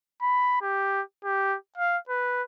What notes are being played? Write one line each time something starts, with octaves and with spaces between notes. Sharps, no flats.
B5
G4
G4
F5
B4